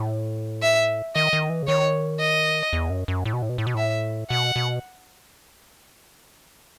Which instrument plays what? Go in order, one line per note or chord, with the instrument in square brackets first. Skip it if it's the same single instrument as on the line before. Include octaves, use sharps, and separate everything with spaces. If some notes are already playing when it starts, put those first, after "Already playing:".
Already playing: [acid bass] A2
[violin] E5
[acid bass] D#3 [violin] D#5
[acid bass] D#3
E3
C#3
[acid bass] D#3 [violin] C#5
[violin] D#5
[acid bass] E2
F#2
F#2
A2
B2
A2
B2
A2
B2
[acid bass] A2 [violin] E5
[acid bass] B2 [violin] F#5
[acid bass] B2